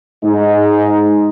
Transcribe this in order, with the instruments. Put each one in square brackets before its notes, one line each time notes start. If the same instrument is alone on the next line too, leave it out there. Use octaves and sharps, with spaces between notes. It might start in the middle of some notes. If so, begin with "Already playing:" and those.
[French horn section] G#2 G#3 D#4 G#4